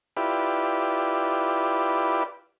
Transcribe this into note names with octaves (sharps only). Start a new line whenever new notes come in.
E4 F4 G4 B4 D5